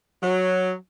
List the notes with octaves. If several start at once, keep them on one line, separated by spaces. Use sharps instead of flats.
F#3